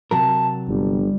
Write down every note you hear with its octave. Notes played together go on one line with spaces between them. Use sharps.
C3 F#3 A#4 A5
G1 G3